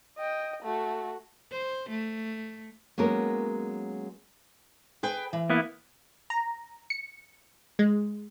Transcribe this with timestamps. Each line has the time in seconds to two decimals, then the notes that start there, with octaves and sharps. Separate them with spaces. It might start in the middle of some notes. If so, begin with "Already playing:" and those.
0.18 D#5 G5
0.63 A3 F#4
1.52 C5
1.89 A3
2.98 F#3 G#3 A#3 B3 C#4 A#4
5.03 G#4 B4 G5
5.33 E3
5.50 A#3 B3 E4
6.30 A#5
6.90 C#7
7.79 G#3